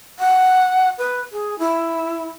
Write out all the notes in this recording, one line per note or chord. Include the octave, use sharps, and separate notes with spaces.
F#5
B4
G#4
E4